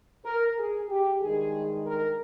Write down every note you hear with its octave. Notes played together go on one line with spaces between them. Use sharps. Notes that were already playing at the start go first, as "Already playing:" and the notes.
A#4
G#4
G4
G2 D#3 G#3 G#4
A#4